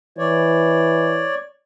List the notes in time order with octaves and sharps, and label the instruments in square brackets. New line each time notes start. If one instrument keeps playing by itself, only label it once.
[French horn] E3 [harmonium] C#5 D5